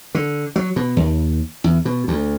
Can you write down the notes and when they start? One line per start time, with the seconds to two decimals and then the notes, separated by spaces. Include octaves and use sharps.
0.15 D3
0.56 F#3
0.76 B2
0.97 D#2
1.64 E2
1.85 B2
2.08 D2